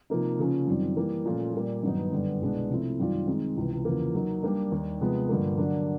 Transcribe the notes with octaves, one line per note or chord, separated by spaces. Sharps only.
C3 F3 A#3 D#4
C#3 F3 A#3 C#4
F#2 D#3 G3 C4 F4
E3 G3 A#3
A#2 F3 A3 C#4 F4
A#2 G3 A#3
G2 D#3 F#3 B3 D#4
F#2 D3 G3 B3
C2 B2 G#3 B3 D4
C3 F3 A3 C4 E4
F#2 D#3 G3 C4 F4
D#3 G#3 C4
C#2 C3 E3
E2 C#3 F3 A#3
F#3 A#3 D#4
G3 A#3 D4
D#2 D#3 G3
C3 F3 G#3 B3
G2 D3 F3 A#3
D3 F#3 A#3 D4